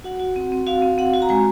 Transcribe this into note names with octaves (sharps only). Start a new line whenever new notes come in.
F#4 F#5
F#4
C4
C4
F#4 F5
C4
C4 F#5
F#4
A#5
G#3 G#5